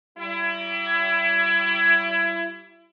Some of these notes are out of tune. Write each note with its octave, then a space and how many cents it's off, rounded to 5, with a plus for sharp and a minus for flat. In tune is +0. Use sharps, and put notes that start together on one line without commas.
G3 -30 E4 +30